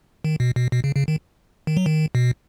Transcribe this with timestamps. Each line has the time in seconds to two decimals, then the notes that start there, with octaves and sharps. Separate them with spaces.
0.25 D#3
0.40 B2
0.56 B2
0.72 B2
0.84 C#3
0.96 C#3
1.08 D#3
1.67 D#3
1.77 F#3
1.86 D#3
2.15 B2